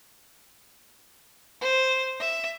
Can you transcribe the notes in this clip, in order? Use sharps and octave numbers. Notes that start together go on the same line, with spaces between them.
C5
E5